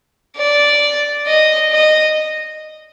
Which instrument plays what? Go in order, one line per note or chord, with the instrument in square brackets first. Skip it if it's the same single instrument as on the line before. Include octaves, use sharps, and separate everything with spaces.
[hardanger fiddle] D5
D#5
D#5